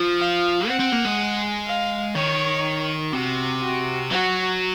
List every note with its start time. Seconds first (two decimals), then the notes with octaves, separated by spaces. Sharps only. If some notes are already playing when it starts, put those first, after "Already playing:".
Already playing: F3
0.20 F5
0.68 C4 F#5
0.80 C4
0.93 A#3
1.05 G#3
1.66 F5
2.15 D#3 C#5
3.12 C3 F#4
3.62 F#4
4.11 F#3 F#4